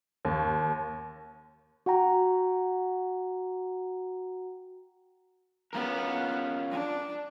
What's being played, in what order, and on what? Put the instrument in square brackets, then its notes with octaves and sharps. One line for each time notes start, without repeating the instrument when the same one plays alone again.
[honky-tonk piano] D#2
[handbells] F#4 F#5 G5 A#5
[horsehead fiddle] B3 [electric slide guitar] C#4 F4 A#4
[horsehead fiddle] D4